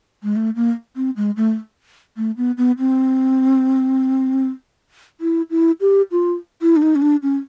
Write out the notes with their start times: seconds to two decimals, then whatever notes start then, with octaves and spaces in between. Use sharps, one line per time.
0.23 G#3
0.36 A3
0.56 A#3
0.96 C4
1.17 G#3
1.37 A3
2.17 A3
2.37 B3
2.58 B3
2.79 C4
5.21 E4
5.50 E4
5.81 G4
6.12 F4
6.62 E4
6.76 D4
6.82 D#4
6.95 C#4
7.02 D4
7.22 C#4